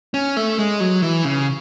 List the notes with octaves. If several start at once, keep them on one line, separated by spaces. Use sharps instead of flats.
C#4
A3
G#3
F#3
E3
C#3